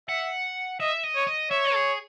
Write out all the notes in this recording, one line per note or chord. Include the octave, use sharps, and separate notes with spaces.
E5 F#5
D#5 E5
D#5
C#5
D#5
C#5 E5
G#4